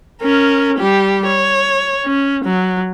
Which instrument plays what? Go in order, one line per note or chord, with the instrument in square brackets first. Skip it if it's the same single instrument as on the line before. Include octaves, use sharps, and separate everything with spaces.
[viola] C#4 A#4
G3 G4
C#5
C#4
F#3